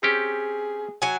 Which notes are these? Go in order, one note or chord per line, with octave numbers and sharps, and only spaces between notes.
C4 C#4 G4 G#4
F#3 G#5